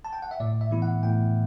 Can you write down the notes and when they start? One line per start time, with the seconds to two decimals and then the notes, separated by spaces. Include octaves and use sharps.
0.05 A5
0.13 G5
0.22 F#5
0.31 E5
0.40 A2 D5
0.61 E5
0.71 E3 B3 E4
0.82 F#5
1.03 A2 G5